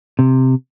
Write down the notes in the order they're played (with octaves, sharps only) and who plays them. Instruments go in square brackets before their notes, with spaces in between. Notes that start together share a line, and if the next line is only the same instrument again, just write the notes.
[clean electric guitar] C3